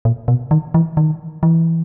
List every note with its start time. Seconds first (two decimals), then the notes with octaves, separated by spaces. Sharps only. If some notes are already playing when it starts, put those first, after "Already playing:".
0.05 A#2
0.28 B2
0.51 D#3
0.74 E3
0.97 D#3
1.43 E3